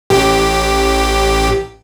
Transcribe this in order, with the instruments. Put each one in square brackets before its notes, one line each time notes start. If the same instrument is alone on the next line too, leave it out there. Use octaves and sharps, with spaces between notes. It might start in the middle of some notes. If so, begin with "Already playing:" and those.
[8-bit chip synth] A1 G4